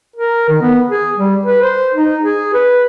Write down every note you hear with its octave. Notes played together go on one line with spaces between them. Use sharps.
A#4
D#3
B3
G#4
G3
B4
C5
D#4
G#4
B4